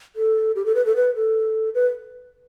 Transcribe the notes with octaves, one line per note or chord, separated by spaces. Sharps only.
A4
G4
A4
B4
A4
B4
A4
B4